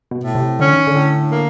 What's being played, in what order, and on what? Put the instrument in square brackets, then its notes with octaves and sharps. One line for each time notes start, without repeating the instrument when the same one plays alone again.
[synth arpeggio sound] B2
[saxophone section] A2
[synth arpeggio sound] C3
[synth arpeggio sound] D3 [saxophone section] C#4
[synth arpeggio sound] D#3
D3
[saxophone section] A2
A#3